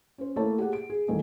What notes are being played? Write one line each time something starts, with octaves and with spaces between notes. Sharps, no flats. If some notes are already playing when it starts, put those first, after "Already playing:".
C#4 C5
A3 A#3 E4 C#5 A5
G4 G#4 F#5
D7
G#4
D#1 E2 D#3 A3 D#5 G#5